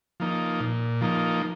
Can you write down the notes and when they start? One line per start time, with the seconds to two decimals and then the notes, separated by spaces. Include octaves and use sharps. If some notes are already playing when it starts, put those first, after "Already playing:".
0.20 F3 A#3 D#4
0.61 A#2
1.01 F3 A#3 D#4